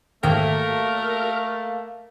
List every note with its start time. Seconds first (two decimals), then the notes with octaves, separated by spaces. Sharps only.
0.23 G#2 D#3 A3 A#3 A#4 G5